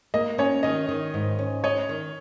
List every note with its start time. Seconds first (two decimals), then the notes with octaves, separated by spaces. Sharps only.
0.14 A#3 D#5
0.38 C#4 C#5
0.63 D#3 D#5
0.89 D#3
1.14 G#2
1.39 C#4
1.64 C#5 D#5
1.89 D#3